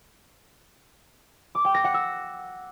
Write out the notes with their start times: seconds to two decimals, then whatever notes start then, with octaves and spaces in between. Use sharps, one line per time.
1.55 D6
1.65 G5
1.74 A#6
1.84 F#5
1.94 E6